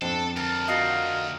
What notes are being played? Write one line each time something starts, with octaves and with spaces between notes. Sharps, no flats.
F2 F3 C4 D4 A4
D2 A#4 A5
D#4 F4 F#4